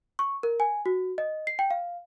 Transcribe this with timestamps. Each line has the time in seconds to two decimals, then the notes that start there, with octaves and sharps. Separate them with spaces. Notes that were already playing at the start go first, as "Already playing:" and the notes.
0.19 C#6
0.43 A#4
0.60 G#5
0.86 F#4
1.18 D#5
1.47 C7
1.59 G5
1.71 F5